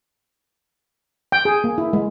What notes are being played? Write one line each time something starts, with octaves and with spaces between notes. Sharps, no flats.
G5
G#4
A#3
E4
G#3